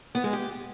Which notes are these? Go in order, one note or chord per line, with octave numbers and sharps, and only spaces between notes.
B3
G#3
G4